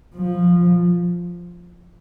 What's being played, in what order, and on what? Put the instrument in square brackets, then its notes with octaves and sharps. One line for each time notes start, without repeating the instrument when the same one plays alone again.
[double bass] F3